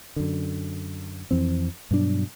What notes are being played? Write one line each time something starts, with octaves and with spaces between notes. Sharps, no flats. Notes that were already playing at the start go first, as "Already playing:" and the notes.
F#2 D3
F2 E3 C4
G2 B2 F#3 D4